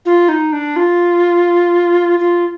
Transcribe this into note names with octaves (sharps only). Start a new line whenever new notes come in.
F4
D#4
D4
F4
F4